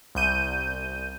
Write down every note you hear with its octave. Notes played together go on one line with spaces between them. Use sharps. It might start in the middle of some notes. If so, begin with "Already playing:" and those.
C2 G6 D#7